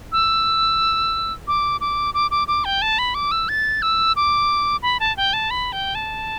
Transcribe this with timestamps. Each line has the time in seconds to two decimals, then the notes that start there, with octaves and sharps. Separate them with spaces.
0.12 E6
1.48 D6
1.81 D6
2.14 D6
2.31 D6
2.48 D6
2.65 G5
2.82 A5
2.99 B5
3.15 D6
3.31 E6
3.49 A6
3.82 E6
4.16 D6
4.82 B5
5.00 A5
5.17 G5
5.33 A5
5.51 B5
5.72 G5
5.95 A5